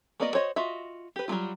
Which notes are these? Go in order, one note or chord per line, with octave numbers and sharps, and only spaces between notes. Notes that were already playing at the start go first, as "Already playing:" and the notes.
A#3 B3 F#4 D5 D#5
F#4 C5 C#5 D#5
F4 F#4 D#5 E5
G4 B4
F#3 G3 A3 F4